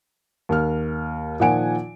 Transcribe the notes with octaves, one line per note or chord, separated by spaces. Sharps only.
D#2 F6
A#2 D#3 F3 F#5 G#5 D7